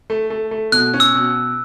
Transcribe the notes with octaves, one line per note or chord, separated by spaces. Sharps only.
A3
A3
A3
B2 F#6
C#4
E6
B2